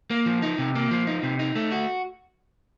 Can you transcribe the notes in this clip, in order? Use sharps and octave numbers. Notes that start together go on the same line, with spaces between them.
A#3
F3
D#4
C3
A#3
F3
D#4
C3
D#4
A3
F#4